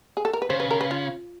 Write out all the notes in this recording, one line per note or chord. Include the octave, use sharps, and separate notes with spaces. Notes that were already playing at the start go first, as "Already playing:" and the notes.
G#4
A4
A#4
B4
C#3 C5
B4
A#4
B4
F4